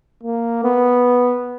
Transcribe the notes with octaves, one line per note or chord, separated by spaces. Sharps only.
A#3
B3